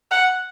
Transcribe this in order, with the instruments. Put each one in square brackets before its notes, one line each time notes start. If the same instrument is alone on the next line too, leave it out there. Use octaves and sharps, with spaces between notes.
[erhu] F#5